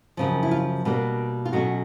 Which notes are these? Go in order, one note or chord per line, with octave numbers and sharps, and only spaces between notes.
F#2 C#3 F3
E4
F4
B2 G3 A#3 D4
F4
B2 F#3 A3 C#4 F#4